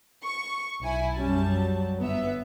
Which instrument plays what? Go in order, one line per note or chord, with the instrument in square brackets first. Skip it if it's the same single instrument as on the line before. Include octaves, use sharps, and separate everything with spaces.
[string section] C#6
B1 E4 G#5
[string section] F#2 G3 A5 [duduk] C#4
[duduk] F#3
[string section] G1 B3 E5